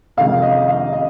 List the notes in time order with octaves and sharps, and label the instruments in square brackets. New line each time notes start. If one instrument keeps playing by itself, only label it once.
[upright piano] F2 C3 D#3 G#3 F5
D#5
F5
D#5